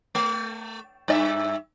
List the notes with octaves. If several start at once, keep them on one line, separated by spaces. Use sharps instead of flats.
A3
G2 D5 E5